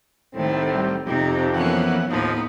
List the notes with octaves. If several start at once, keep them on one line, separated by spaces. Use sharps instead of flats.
C2 A2 D#3 A3 C4
G3
F2 C3 D#4 G4
E3 F3 A#3 B3 C#4 F#5
D#2 A2 F3 A#3 B3 D#4